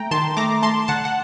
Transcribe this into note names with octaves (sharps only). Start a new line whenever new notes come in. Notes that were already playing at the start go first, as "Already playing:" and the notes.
Already playing: A3 G5 A#5
D#3 A5 C6
A3 A#5 D6
A3 A5 C6
D3 F#5 A5
F#5